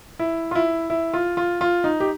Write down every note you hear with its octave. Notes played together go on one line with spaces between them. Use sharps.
E4
F4
E4
E4
F4
F4
F4
D#4
G4